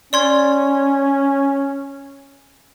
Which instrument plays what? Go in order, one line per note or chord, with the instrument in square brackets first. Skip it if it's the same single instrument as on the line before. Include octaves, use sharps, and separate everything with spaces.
[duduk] C#4 [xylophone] D5 C6 G#6